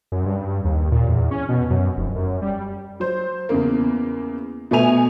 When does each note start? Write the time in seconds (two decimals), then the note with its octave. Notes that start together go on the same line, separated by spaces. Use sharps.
0.12 F#2
0.26 G2
0.64 D#2
0.92 A#2
1.09 E2
1.31 C#4
1.49 B2
1.70 F#2
1.97 F1
2.16 F#2
2.42 G3
3.00 F#3 C5
3.49 E2 C#3 A#3
4.71 B2 A3 B3 G#5 F7